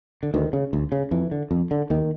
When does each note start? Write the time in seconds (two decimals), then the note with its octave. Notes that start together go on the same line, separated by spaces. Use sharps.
0.23 D3
0.34 D2 D#3
0.53 C#3
0.73 D2
0.92 C#3
1.11 F2 E3
1.31 D3
1.51 F2
1.71 D3
1.90 D#2 D#3